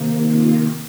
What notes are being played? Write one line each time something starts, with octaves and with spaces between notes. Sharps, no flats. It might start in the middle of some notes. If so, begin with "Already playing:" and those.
Already playing: C3 D#3 A#3
F4